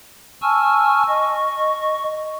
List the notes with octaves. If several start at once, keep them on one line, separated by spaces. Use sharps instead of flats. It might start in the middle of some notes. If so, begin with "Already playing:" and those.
G#5 A5 C#6 E6 F6
D#5 C#6